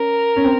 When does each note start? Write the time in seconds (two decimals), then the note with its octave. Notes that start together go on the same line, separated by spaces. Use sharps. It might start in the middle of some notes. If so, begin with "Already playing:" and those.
Already playing: C#4 A#4
0.36 C#4
0.44 C4